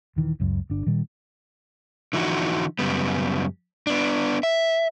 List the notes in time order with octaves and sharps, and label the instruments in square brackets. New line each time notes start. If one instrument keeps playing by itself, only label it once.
[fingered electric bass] D#1 D#3 E3
C#2 F#2 C#3
G1 D4
A#2 D#3 G3
[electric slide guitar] D3 E3 F3 D#4 F#4
F#2 C#3 G3 B3
B3 D4
E5